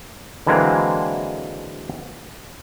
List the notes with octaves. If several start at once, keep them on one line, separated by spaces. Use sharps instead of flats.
D3 E3 F#3 G#3 A#3 C4